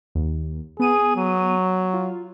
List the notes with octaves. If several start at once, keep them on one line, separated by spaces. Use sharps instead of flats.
D#2
B3 G#4 D#7
F#3
F4